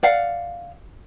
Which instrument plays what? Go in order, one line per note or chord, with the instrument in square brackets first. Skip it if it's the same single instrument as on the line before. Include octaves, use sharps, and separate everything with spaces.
[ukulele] D5 F5 F#5